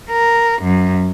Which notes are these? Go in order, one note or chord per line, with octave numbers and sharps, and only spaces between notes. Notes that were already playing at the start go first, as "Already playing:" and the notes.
A#4
F#2